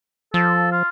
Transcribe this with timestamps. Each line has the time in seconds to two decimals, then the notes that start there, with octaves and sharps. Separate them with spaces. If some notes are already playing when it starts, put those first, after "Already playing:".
0.34 F3 A4
0.72 F4